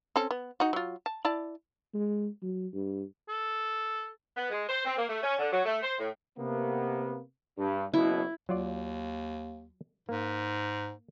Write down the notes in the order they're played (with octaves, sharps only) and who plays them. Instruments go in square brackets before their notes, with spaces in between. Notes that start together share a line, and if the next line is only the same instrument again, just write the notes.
[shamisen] C4 C#4 A4
B3
D#4 F#4
F#3 F4
A5
E4 D5 A5
[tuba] G#3
F#3
G2
[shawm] A4
[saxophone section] B3
G#3
C5
C4
A#3
A3
C#4
D3
F#3
A3
C5
A2
[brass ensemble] C3 A#3 B3
G2
[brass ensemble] F#1 B2 [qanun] E4
[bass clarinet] D#2 [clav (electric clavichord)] F#3 F4 D5
[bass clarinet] G#2 [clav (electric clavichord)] A#3